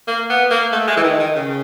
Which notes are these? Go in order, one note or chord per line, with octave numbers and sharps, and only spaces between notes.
A#3
B3
A#3
A3
G#3
E3
D#3
D#3
C#3